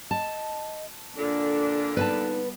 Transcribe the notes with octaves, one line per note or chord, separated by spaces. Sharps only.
D#5 A5
A#2 D3 D4 A4
G3 B3 D#4 B4 G#5 A5